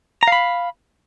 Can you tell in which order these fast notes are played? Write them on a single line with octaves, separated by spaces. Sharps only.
A#5 F5 B5